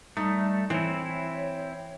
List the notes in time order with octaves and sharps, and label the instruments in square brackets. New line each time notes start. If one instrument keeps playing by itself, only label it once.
[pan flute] G3 [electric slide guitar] A3 [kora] D#4
[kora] E3 [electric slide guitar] C4 E4 [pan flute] C#5